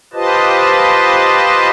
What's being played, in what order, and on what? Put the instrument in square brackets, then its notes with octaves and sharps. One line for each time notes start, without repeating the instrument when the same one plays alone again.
[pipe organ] F4 G4 B4 C5 D#5 A5